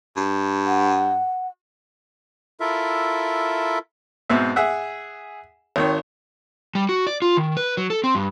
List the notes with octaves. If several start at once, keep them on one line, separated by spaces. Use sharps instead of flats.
G2
F#5
E4 F4 A4 A#4 E5
G#2 B2 C4 E5
G#4 E5 F#5
G#1 D#3 C#5
G3
F#4
D5
F4
D#3
B4
F#3
A4
C4
G2